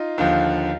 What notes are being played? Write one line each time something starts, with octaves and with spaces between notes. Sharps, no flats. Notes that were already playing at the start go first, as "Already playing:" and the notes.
Already playing: D#4 F4
D#2 D3 F3